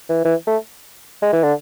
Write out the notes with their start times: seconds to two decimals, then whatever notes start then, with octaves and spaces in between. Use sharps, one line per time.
0.09 E3
0.25 E3
0.47 A3
1.22 G#3
1.33 E3
1.43 D3